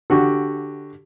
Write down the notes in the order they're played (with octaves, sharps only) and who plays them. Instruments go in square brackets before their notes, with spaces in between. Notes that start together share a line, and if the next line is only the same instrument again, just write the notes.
[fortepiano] D3 F#4 G4